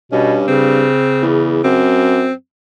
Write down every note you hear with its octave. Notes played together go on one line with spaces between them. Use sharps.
G2 B2 C#4
C#3 C4
E2
F#2 C4